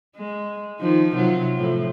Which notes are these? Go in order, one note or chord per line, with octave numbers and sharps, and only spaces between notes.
G#3
D#3 F3 D#4
C3 F#3 F4
A2 F3